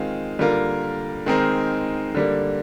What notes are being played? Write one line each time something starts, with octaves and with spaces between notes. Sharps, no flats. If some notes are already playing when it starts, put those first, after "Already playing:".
Already playing: D#3 G#3 C4 F4
D3 G3 A#3 F4 A#4
D#3 G#3 C4 D#4 A#4
D3 G3 A#3